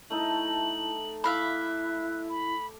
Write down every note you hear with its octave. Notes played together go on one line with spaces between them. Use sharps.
A3 D#4 E4 A4 F#7
E4 E5 F5 B5 D6 F#6
B5